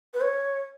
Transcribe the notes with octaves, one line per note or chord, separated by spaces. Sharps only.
B4
C#5